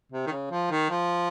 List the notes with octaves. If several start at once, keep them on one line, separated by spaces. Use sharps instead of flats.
C3
D#3
C#3
F3
D#3
F3